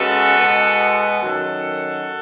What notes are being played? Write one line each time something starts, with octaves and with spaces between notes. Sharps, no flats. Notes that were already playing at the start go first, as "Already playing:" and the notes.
Already playing: C#3 G#3 B3 F#4 A4
B2 G#3 B3
F#2 D#3 F#3 F#4 A4